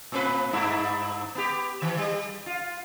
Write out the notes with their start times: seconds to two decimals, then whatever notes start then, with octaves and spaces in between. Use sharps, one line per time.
0.12 A2 C4 B4
0.53 G2 D#4 E4
1.35 B3 G4
1.82 D#3 E3
1.97 G3
2.46 F4